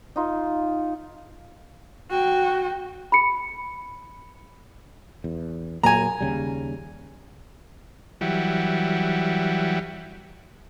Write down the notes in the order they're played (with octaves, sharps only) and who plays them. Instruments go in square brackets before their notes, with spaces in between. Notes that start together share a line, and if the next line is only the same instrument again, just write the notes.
[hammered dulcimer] D#4 F4
[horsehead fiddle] F#4 G5
[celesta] B5 C#7
[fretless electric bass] E2
[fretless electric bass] A#2 F#3 A#3 [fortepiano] G#5 A#5
[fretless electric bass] D#2 C#3 G3
[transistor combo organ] E3 F#3 G3